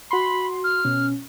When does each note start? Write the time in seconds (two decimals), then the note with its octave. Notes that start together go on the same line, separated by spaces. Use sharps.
0.11 F#4 B5 C6
0.64 F6
0.85 B2 C#4